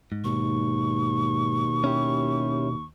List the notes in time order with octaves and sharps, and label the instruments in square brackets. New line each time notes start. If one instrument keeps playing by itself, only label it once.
[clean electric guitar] G#2
[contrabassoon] D#2 [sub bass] B2 [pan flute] C#6
[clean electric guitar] C#4 E4 G4